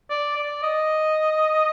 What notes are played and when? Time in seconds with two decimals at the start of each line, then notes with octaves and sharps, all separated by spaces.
0.10 D5
0.36 D5
0.63 D#5